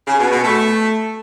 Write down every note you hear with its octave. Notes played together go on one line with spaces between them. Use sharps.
C#3
B2
B2
A3